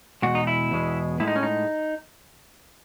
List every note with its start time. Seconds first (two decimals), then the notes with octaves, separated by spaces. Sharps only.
0.22 E2 B2 G#3 F#4
0.35 D#4
0.47 E4
0.71 E2 B2 G#3
1.20 A2 G#3 E4
1.28 D#4
1.36 C#4
1.43 D#4